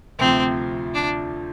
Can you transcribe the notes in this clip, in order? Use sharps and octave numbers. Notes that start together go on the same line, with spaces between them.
D2 C3 F3 C4
D4